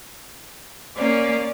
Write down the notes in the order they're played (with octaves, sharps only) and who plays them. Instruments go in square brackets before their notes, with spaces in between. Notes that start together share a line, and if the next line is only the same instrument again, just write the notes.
[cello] A#3 C#4 [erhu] D5